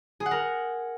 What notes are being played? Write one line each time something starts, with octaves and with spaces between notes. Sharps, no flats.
G#4
F#5
A#4